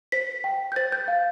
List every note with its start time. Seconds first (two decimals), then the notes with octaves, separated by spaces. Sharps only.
0.12 C5 B6
0.44 G5
0.72 G6
0.76 C5 A6
0.92 G6
1.08 F5